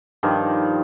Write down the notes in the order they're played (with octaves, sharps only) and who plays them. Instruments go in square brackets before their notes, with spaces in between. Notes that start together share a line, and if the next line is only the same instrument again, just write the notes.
[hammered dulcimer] G2 D#3 F3